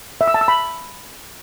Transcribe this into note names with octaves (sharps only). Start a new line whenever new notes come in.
E5
E6
A5
E6
B5